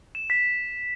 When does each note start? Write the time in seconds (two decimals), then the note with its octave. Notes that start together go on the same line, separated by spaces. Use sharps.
0.15 E7
0.30 B6